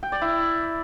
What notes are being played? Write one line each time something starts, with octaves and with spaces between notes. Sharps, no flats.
G5
D5
E4